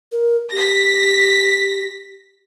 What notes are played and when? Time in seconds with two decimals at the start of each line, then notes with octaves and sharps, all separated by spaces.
0.12 A#4
0.52 G4 A#6 B6